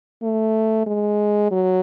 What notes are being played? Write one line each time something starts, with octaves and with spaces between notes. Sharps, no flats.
A3
G#3
F#3